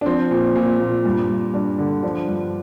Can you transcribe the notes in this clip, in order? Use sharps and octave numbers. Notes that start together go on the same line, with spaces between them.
D4
F3 C4
A#2
A#2
A#2
G2
G2
G2 D4
D3
F3 D4
G2